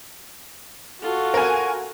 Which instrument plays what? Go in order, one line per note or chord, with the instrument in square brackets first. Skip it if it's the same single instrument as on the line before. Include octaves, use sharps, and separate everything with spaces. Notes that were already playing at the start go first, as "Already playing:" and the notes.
[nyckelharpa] F4 A4 [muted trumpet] F#4
[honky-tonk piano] A#4 G#5